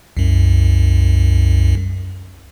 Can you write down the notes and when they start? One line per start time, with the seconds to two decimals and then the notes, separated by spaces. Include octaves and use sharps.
0.17 C2 F#2